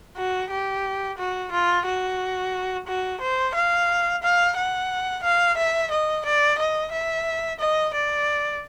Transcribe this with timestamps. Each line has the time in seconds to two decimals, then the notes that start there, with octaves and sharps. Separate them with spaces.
0.17 F#4
0.50 G4
1.18 F#4
1.52 F4
1.85 F#4
2.87 F#4
3.21 C5
3.54 F5
4.23 F5
4.56 F#5
5.23 F5
5.57 E5
5.91 D#5
6.25 D5
6.58 D#5
6.92 E5
7.59 D#5
7.94 D5